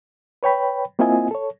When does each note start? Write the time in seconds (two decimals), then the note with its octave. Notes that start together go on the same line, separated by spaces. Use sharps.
0.43 B4 C#5 G5 B5
0.99 A#3 C4 E4 F4 D#5 G#5
1.31 A4 C#5